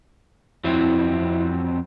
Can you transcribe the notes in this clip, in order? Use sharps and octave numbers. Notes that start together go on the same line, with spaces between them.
F2 F#3 C4 E4